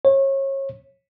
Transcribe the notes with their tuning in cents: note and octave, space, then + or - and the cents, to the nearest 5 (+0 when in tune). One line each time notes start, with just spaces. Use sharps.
C#5 -30